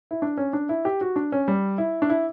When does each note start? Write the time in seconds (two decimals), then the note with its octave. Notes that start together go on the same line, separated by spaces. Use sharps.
0.11 E4
0.22 D4
0.38 C#4
0.53 D4
0.69 E4
0.85 G4
1.01 F#4
1.16 D4
1.32 C#4
1.48 G3
1.78 E4
2.02 D4
2.10 E4